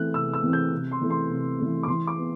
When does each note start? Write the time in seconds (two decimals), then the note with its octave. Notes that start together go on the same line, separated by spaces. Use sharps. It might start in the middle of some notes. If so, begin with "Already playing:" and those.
Already playing: E3 A3 C4 F#6
0.14 C3 E6
0.33 E6
0.43 E3 A3 C4
0.53 G6
0.72 C3
0.91 C6
1.02 E3 A3
1.10 C6
1.29 C3
1.59 E3 A3
1.83 D6
1.87 E3 C6
2.07 D6
2.17 B3